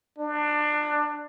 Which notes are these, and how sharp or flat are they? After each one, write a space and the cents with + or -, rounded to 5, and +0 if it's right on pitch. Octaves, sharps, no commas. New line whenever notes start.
D4 +20